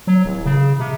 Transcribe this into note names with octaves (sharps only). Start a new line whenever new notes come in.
F#3
D1
C#3
C3